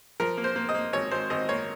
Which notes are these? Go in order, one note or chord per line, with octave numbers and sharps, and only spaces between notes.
F3 A#4
A#3
C5
A#3
D#5
A#3
G#1 C#5
G#1 C5
G#1 D#5
A#3 C#5